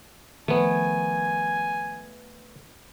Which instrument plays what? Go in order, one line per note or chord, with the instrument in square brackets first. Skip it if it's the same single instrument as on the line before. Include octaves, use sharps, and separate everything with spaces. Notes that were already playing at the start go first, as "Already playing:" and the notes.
[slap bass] D#3 F3 [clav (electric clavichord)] A3 B3 [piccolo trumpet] G#5